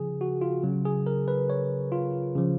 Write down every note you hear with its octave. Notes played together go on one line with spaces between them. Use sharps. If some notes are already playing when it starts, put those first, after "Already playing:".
Already playing: C#3 F3 G#4
F#4
F4
C#3 F#3
G#4
A#4
B4
C#5
F4
C#3 F3